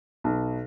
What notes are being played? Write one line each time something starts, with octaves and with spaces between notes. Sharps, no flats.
B1